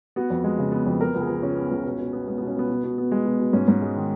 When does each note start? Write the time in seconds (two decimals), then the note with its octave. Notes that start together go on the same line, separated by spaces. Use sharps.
0.16 B3 F#4
0.30 F2
0.44 G#3
0.59 C#3
0.72 B3
0.86 F2
1.00 B3 A#4
1.14 C#2
1.21 G#4
1.29 F3
1.42 C#3 C#4
1.56 B3
1.71 C#2
1.85 B2
1.99 B2
2.13 B3
2.27 G#3 B3
2.38 B2 B3
2.48 C#4
2.56 B2 B3
2.70 B2
2.84 B2
2.98 B3
3.12 G#3
3.26 B2
3.39 B2
3.53 G#2 C#4
3.68 G#2
3.82 G#3
3.96 D#3